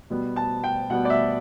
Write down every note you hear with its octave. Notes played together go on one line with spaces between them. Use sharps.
B2 G3 B3
A5
G5
B2 G3 B3 F#5
D5
E5